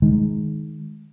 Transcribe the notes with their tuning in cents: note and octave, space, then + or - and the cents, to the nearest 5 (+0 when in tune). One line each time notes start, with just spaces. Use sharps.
D#3 +0 G#3 +5